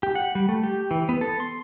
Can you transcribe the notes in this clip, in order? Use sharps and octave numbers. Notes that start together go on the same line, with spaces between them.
G4
F#5
G3
A3
G4
E3
B3
A4
C6